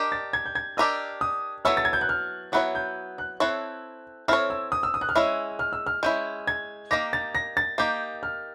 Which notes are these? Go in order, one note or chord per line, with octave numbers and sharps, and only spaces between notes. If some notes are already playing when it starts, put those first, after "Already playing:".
Already playing: D4 G4 A#4 D#5
A6
G#6
G6
G#6
D4 G4 A#4 D#5 E6
D#6
F#3 B3 E4 A4 C#5 E6
A6
G#6
G6
F#6
F6
F#3 B3 E4 A4 C#5 F#6
G6
F#6
C4 E4 A4 C#5 F#6
C4 E4 A4 C#5 F6
E6
D#6
E6
D#6
F#6
F6
G#3 C#4 E4 E6
F6
E6
F6
G#3 C#4 E4 G6
G#6
A#3 D#4 G4 A#6
A6
A#6
A6
A#3 D#4 G4 G6
F6